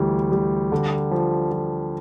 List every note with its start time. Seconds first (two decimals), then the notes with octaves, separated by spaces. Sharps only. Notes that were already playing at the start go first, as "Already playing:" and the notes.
Already playing: D2 E3 G3
0.31 G3
0.72 D3
1.11 F3
1.52 F3